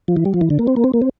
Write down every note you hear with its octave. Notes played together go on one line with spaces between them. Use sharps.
F3
E3
G3
F3
E3
D3
A#3
C4
A#3
C4
A#3
C4